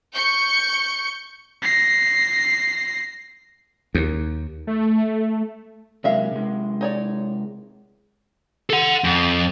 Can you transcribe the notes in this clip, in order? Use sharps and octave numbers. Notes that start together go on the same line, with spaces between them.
C#6 G6 C#7
A#6 C7
D#2
A3
C3 F#3 G#3 A#3 E5 F5
C3 G#3
D#4 C#5 D5
A4 F#5
F2